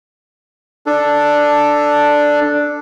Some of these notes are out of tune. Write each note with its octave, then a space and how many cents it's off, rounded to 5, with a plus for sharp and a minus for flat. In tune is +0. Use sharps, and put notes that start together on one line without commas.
D4 +5 A4 +0